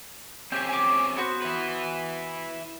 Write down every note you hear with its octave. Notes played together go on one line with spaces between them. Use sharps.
C4 C#4 G4 G5 G#5
G#5 D6
B3 F#4 C5
E4 B4